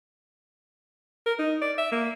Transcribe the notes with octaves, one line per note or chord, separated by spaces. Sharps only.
A#4
D#4
D5
E5
A#3